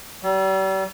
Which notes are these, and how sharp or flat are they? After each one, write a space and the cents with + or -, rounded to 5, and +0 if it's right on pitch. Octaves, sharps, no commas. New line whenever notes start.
G3 -40